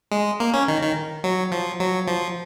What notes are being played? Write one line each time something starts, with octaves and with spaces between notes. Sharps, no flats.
G#3
A#3
C#4
D#3
D#3
F#3
F3
F#3
F3